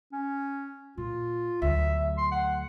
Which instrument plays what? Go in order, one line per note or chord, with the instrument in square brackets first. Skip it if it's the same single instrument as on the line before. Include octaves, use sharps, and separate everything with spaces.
[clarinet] C#4
[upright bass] A#2 [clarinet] F4
[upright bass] D2 F#3 [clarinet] E5
[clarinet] C6
F#5